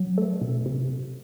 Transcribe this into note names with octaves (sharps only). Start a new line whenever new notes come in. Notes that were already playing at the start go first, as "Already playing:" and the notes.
Already playing: F#3
A3
B2
C3